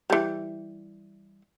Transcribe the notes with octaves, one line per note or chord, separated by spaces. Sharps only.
E3 G3